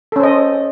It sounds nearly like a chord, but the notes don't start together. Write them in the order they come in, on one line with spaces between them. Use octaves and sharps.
A4 C#4 C5 D#5